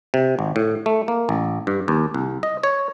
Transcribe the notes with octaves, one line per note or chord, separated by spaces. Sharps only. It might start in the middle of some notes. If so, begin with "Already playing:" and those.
C3
G#1
A2
A3
A#3
A1
G2
D#2
C2
D#5
C#5